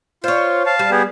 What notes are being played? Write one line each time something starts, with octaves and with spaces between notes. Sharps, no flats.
F4 C5 C#5
F5 A5
G3
B3 G4 G#4